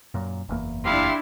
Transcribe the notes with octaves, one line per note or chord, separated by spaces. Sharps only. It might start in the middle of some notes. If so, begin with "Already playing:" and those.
F#2 A#2
F#1 E2 A#3
D4 E4 G4 F5 C6